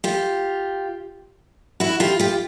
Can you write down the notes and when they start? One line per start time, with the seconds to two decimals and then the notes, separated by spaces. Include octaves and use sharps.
0.04 F4 G4
1.80 E4 F#4
2.00 F4 G4
2.20 F4 G4